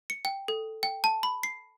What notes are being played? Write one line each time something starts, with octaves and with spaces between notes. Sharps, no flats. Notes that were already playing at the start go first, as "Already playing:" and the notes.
C#7
G5
A4
G5
A5
B5
C7